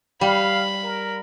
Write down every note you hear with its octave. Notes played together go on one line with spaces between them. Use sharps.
G3 F5 B5
A#4